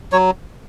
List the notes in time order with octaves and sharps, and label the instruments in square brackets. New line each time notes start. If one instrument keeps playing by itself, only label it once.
[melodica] F#3 C#5